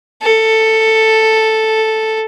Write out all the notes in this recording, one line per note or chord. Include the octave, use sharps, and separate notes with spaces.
A4